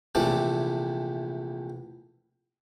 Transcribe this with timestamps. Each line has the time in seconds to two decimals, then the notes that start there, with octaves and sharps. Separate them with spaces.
0.15 A#1 C3 E3 A3 D5